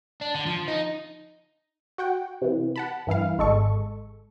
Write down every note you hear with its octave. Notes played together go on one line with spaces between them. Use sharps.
D4
D3
F3
D#4
F#4 F#5 G5
C3 E3
F#5 A5 B5
G2 E3 E4 F5
G#1 G#3 A4 C#6